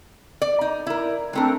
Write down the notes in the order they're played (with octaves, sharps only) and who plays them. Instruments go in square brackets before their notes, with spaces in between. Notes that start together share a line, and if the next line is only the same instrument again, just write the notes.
[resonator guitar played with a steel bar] D5
D#4
E4 A#4
[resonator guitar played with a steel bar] G#3 A3 A#4 [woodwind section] C4 D4